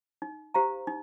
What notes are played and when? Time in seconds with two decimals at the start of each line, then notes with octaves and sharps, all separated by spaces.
0.22 D#4
0.54 G4 C5 F5 A#5
0.87 D#4